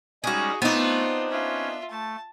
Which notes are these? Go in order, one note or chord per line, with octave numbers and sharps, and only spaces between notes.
G3 G#3 C#4 D#4 F#4 G#4
A3 B3 C4 D4 D#4 F4
C#4 F4 E5
A3 A5